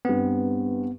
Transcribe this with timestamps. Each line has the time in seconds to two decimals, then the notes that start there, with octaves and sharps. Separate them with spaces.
0.05 G2 B3 C4